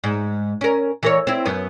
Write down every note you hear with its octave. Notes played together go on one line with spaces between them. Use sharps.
G#2
C#4 A#4
E3 A#4 C#5
C4 E4
F#2 B3